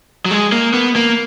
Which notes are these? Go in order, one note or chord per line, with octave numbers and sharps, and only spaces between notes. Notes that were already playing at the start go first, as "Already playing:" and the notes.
F#3
G#3
A#3
B3
A#3